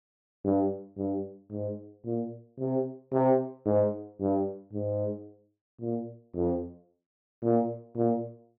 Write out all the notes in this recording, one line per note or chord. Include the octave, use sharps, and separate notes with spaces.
G2
G2
G#2
A#2
C3
C3
G#2
G2
G#2
A#2
F2
A#2
A#2